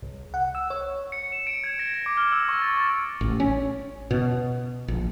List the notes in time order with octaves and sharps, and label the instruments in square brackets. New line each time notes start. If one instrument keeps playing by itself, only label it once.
[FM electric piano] C2
F#5
E6
C#5
[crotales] C#7
E7
D7
G#6
A#6
A#6
D6
F6
E6
C#6
A6
A6
[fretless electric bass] A1
C#4
B2
A#1